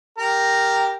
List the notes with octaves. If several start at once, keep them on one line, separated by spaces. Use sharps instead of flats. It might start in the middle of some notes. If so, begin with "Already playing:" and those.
G4 A#4